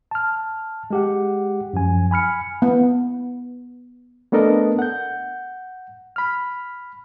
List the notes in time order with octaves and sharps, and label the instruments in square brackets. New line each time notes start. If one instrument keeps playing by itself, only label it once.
[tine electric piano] A5 F6
G#3 G4 F#5
F#2 F3 G#5
G#5 B5 F6 C#7
[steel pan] B3
[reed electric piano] A3 B3 D4 A4 A#4 D#5
F#5 G6
B5 F6